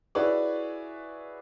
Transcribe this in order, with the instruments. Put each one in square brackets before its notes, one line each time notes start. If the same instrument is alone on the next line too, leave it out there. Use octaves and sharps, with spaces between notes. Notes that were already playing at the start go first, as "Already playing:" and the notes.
[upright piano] E4 F#4 G#4 B4 C#5 D5